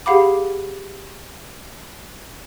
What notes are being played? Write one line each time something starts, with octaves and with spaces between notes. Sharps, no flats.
G4 G#4 F5 F#5 B5 D6